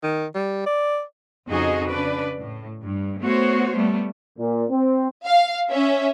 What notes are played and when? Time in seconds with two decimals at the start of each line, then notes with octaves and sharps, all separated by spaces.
0.03 D#3
0.35 G3
0.66 D5
1.47 F2 C#3 D#4 F#4 G#4 D#5
1.89 C#3 D4 B4 D5
2.39 A2
2.83 G2
3.21 A3 B3 F#4 C5 C#5
3.75 G3 A3 B3
4.39 A#2
4.70 C4
5.26 F5
5.70 C#4 E5